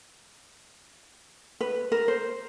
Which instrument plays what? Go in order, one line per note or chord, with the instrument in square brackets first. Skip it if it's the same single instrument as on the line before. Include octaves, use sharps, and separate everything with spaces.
[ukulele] B4
A#4
C5